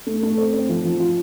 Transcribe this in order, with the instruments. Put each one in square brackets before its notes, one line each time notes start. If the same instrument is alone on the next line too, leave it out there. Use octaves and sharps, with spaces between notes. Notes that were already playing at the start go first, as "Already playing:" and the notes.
[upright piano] A3
A3
C4
C4
F3
F3
F4